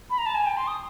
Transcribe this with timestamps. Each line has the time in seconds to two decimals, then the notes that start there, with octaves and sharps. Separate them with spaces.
0.10 B5
0.18 A#5
0.26 A5
0.35 G#5
0.46 G5
0.57 C6
0.67 D#6